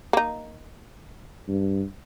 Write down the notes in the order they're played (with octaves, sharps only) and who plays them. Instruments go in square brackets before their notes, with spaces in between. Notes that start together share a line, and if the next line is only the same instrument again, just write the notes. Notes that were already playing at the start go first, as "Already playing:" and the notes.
[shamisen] A#3 D#4
[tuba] G2